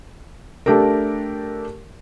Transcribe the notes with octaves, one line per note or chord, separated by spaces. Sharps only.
A3 D4 G4 A4 A#4